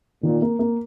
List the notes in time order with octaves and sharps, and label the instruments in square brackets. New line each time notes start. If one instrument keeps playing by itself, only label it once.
[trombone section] A#2 [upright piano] D#3
[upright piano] A#3
A#3